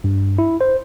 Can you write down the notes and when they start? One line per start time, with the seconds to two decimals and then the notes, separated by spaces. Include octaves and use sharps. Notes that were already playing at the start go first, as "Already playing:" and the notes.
0.04 G2
0.38 E4
0.61 C5